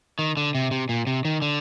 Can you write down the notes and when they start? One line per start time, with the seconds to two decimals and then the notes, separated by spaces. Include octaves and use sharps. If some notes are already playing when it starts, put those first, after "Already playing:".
0.19 D#3
0.37 D3
0.55 C3
0.71 C3
0.89 A#2
1.07 C3
1.25 D#3
1.42 D3